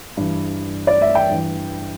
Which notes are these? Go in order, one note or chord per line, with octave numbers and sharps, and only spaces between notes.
G2 E3
D5
E5
G5
G2 E3